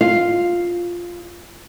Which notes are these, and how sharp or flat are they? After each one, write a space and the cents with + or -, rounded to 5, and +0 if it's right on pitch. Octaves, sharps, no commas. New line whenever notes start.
F4 +0 F5 +0